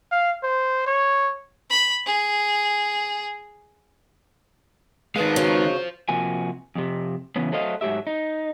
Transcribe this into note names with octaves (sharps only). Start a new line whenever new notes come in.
F5
C5
C#5
B5
G#4
D#3 G#3 B4 C5 F5
C#3 F#3
C3 F3 A#3 F#4 G#5
F2 C3
C#3 E3 F#3 B3 C#4
F#3 A3 A4 C5 D#5 F5
G#2 F#3 A3 G4 E5
D#4